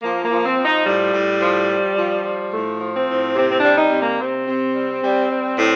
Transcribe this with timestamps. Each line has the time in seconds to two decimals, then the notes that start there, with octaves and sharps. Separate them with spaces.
0.02 F3 A#3
0.24 A#3
0.31 F3
0.45 C4
0.58 F3
0.65 D#4
0.86 A2 G3
1.14 A2
1.42 F3
1.70 F3
1.98 F3
2.25 F3
2.53 A2 A3
2.80 F3
2.95 C4
3.09 A2
3.36 C3 C4
3.50 C4
3.58 D4
3.64 G3
3.78 D#4
3.91 C3
3.99 A#3
4.20 C3 C4
4.48 C3
4.75 G3
5.03 G3
5.31 G3
5.58 A2